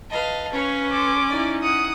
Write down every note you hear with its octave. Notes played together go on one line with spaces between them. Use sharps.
B4 D#5 F5 A5
C#4 B4 C#5 F5
A4 C6 D6
D#4 E4 D5
F#5 D#6